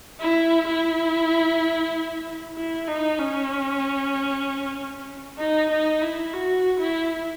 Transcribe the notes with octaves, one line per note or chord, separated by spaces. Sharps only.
E4
E4
E4
D#4
C#4
D#4
D#4
E4
F#4
E4